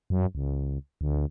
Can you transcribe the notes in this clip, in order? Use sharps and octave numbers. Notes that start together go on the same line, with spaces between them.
F#2
C#2
D2